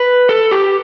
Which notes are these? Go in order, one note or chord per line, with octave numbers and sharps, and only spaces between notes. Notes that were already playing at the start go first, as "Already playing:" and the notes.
Already playing: B4
A4
G4